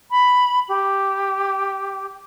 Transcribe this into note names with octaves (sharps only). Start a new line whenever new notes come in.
B5
G4